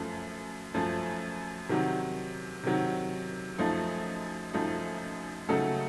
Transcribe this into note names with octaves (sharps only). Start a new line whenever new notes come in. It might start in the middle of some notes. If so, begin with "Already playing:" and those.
Already playing: F#2 F3 A3
F#2 F3 A3
C3 D#3 F#3
C3 D#3 F#3
F#2 F3 A3 D#4
F#2 F3 A3 D#4
C#3 F#3 A3 D#4 A4